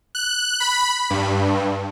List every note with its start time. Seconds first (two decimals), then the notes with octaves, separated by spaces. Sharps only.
0.15 F#6
0.60 B5
1.10 G2